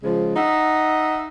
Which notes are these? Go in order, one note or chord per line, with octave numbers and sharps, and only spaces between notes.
C#3 F3 G#3
D#4 E5 F#5